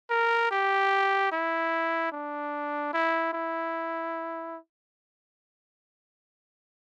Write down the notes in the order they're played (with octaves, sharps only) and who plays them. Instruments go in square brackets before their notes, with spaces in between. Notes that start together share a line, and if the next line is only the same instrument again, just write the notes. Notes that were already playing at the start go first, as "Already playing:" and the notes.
[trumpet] A#4
G4
E4
D4
E4
E4